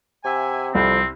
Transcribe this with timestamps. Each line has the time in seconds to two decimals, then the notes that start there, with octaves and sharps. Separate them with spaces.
0.25 C3 E5 F#5 G#5
0.75 C2 F2 F3 C4